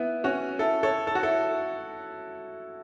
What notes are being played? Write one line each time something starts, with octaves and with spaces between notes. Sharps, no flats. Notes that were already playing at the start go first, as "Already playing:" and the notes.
Already playing: B3 E4
C#4 F#4
E4 A4
A4 C#5
A4
F#4
E4 A4